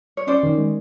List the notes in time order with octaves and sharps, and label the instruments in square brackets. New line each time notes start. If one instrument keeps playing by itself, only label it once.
[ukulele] C#5
[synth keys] C#4 [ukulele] C5 D5
[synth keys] D#3
G#3